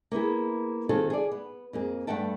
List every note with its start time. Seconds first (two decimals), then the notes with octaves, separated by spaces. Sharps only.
0.12 A#3 B3 E4 G#4
0.89 D#3 C4 F4 F#4 G#4 A4
1.10 G#4 D5
1.32 B3
1.73 F2 A#3 G#4
2.07 G2 A3 B3 F#5 G5 A5